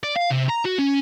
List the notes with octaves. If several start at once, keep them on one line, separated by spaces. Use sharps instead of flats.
D5
F5
C3
A#5
F#4
C#4